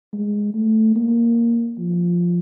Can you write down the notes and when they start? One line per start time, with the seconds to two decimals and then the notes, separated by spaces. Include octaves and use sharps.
0.13 G#3
0.54 A3
0.96 A#3
1.78 F3